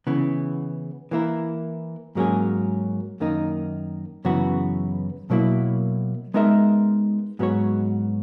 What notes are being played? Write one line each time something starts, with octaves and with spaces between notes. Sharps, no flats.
C#3 E3 B3
E3 A#3 E4 A#4
G#2 F#3 A#3 C#4 G#4
F#2 D#3 A#3 D#4
F#2 C#3 E3 B3 F#4
B2 F#3 A#3 E4
G#3 B3 D#4 A#4 E5
G#2 F#3 B3 F#4 C#5